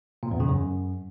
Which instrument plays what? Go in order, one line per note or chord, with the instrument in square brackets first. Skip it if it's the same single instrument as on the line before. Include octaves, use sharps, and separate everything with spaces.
[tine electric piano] A#2
E2
C#3
F#2